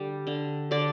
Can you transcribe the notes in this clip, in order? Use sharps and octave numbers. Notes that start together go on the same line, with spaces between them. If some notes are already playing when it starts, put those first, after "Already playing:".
Already playing: D3 G3
D3
D3 D5